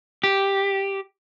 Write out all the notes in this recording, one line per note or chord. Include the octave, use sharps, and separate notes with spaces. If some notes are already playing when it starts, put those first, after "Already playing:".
G4